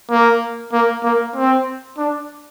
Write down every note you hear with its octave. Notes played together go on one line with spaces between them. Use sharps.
A#3
A#3
A#3
C4
D4